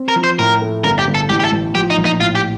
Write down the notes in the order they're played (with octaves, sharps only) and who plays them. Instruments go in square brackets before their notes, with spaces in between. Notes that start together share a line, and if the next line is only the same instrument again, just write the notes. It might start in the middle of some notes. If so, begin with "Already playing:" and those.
Already playing: [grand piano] C4
[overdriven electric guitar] A#4
[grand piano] F3
[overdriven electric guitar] C5
[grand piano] A2 [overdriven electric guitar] A#4
[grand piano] A3
[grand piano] G1 [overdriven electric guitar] A#4
[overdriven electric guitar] G4
[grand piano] G1
[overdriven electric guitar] A4
[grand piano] A1 [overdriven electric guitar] G4
[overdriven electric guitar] G4
A4
[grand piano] A1
[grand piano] F3 [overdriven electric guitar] G4
[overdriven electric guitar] D#4
[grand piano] A#1
[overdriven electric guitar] D#4
[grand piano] A2 [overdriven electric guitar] F4
[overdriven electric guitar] G4